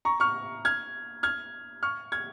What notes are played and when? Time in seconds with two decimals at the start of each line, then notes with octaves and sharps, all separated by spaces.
0.05 A#5 C#6
0.20 C#6 F6
0.65 F6 G#6
1.23 F6 G#6
1.83 C#6 F6
2.12 F6 G#6